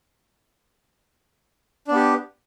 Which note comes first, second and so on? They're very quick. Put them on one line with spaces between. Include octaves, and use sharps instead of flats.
D4 B3 G4